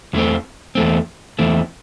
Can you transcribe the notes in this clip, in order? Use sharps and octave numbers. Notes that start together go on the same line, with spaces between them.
E2 E3 A3 C4
E2 E3 A3 C4
E2 E3 A3 C4